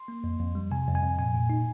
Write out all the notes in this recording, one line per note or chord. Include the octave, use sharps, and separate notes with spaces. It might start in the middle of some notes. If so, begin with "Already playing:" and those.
Already playing: C6
A#3
F2
F2
G3
C3 G#5
F2
G#5
F2
A#2 G#5
A#2
D#4